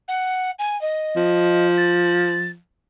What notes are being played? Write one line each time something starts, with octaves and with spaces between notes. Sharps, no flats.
F#5
G#5
D#5
F3
A6